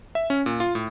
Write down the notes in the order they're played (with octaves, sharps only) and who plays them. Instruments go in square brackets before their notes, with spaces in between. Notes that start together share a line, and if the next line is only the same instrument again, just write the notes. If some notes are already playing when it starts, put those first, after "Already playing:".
[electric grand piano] E5
C#4
A#2
F4
A2